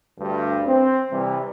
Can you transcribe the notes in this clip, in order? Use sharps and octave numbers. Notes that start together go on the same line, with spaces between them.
D2 G2
C4
C3 E3 G3